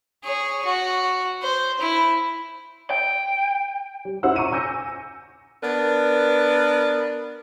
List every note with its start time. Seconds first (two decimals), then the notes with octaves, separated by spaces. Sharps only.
0.23 G#4 C#5
0.65 F#4
1.42 C5
1.80 E4
2.90 G5
4.05 G3
4.23 C#4 E4 F#4 C5 F#5 E6
4.35 A#5 C#6 D6 C#7 D#7 E7
4.52 G#5 E6 G6 A#6 C#7
5.62 B3 D4 A#4 B4